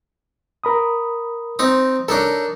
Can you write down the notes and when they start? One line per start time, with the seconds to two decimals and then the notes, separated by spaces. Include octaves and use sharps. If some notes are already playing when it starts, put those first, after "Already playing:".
0.64 A#4 B5 D#6
1.59 C4 D#4 D#6
2.08 D4 D#4 A4 A#4 C#5